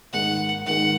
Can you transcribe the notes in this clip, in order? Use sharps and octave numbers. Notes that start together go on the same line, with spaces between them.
G#2 D#3 G#3 F#5
G#2 D#3 G#3 F#5